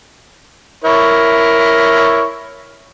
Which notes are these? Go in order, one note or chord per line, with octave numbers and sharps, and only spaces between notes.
E4 A#4 C#5